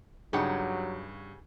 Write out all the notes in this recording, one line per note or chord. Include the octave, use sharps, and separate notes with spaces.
G2 C#3 F#3 D4 D#4 G4 G#4 F#5